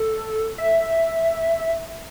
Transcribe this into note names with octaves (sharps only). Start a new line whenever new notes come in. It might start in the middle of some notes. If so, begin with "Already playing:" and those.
Already playing: A4
E5